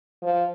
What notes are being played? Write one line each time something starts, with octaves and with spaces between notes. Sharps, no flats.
F3